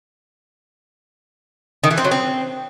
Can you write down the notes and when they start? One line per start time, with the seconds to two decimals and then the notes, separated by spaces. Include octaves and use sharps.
1.84 D#3
1.91 E3
1.98 C4
2.05 F#3
2.11 C4